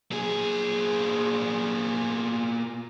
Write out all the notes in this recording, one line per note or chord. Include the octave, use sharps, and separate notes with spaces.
A#2 G#4